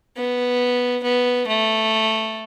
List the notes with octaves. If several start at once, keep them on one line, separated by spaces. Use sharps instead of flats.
B3
B3
A3